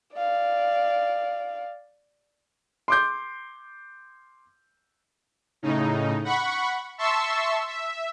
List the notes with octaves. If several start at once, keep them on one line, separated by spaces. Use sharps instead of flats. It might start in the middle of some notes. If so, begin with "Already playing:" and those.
D5 F5
C6 D6 G6
A2 C#3 D#4
F#5 B5 C#6
E5 A5 C6 C#6 E6
E5